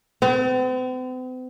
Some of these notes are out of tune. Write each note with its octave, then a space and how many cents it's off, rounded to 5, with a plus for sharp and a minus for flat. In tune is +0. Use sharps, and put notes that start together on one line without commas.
C4 -45